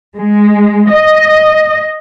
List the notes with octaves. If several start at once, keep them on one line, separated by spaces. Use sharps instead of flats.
G#3
D#5